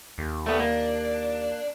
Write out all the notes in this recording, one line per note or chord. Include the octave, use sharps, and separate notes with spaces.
D#2
A3 B3 D4
A#3